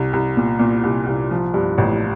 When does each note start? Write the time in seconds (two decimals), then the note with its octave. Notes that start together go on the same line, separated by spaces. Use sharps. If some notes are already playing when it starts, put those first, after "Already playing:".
Already playing: C2
0.13 C2
0.37 A#2
0.59 A#2
0.84 C2
1.07 C2
1.31 F3
1.54 G2
1.78 A1